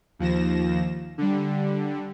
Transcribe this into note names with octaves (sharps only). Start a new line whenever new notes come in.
D#2 F3 A#6 E7
D3 G3